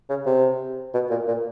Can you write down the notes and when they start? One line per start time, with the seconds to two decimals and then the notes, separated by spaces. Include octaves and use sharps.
0.09 C#3
0.26 C3
0.94 B2
1.10 A#2
1.28 A#2